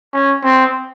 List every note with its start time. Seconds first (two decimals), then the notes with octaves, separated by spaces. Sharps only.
0.13 C#4
0.43 C4